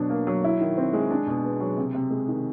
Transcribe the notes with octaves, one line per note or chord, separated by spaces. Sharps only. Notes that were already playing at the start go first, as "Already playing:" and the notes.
Already playing: B2 F#3 D4
A#3
F#3
E4
D#3
C4
G#3
D4
B2
B3
F#3
C3
C3
G#3
D#3